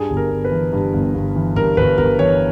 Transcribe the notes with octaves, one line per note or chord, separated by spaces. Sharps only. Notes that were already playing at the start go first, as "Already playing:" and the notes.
Already playing: G2 G#4
G1
A#4
G1
B4
E3
G2
G1
G1
E3
G2 A#4
G1 B4
G1 A#4
E3 C#5